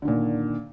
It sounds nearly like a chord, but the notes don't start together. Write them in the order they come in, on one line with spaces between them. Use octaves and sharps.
D3 D#3 A#2